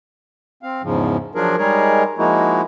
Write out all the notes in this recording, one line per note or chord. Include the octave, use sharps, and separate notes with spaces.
C4 F5
E2 G#2 C#3 F3
F3 F#3 D4 F4 G#4 A#4
G3 G#3 D#4 G#4 A#4 C#5
F3 G#3 A#3 D#4 E4 F#4